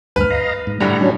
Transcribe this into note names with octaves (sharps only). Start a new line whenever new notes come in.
D2 G2 B4 F6
D#5 F5 A#5
G#2
A2 D3 G3 F#5 A#5
F#3 C#4 D4